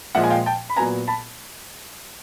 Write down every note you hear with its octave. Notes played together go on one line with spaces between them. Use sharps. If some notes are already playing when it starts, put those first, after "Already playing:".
A#2 F3 G#3 E5 F#5
G#5
F5 G5
G5 A5
B5
A#2 F#3 B3 G#5 A#5
A5 B5